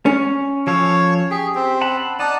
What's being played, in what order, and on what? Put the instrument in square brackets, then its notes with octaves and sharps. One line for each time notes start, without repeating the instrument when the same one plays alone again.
[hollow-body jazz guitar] C#4
[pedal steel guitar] F3 A4 F5 [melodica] C#5
[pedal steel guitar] G4 [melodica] G#4
[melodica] C4
[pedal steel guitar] F#5 A5 B5
[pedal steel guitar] D#4 [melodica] D5 F#5 A5